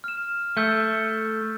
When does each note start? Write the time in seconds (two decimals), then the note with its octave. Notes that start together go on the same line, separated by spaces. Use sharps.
0.04 F6 E7
0.57 A3 E6 G6 A6